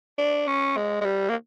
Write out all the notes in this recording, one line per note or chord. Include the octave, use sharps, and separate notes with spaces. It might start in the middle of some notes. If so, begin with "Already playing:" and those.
D4
C#4
G#3
G#3
G3
A#3